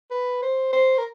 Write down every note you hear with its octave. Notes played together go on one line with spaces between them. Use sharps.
B4
C5
C5
A#4